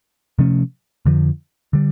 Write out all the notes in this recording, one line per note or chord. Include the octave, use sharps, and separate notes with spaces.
C3 F3 A3 C#4
F2 D3 F3
D3 G3